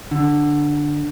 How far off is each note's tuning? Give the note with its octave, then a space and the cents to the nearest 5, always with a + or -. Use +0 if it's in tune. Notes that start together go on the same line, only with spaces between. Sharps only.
D3 +5